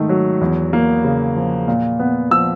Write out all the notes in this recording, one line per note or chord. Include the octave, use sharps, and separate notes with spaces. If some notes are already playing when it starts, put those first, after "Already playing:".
Already playing: G#2 D#3 A3
F#3
E2
A#3
C#3
F3
A#2
B3
F3 E6